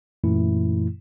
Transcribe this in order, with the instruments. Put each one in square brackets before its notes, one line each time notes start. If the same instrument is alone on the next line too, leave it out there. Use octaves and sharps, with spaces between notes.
[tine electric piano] F#2 A#2 E3 A3 E4